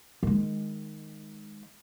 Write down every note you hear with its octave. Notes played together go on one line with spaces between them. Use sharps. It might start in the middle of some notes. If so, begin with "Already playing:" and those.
D#3 G#3